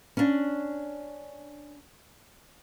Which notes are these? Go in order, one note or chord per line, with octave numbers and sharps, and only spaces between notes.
C#4 D4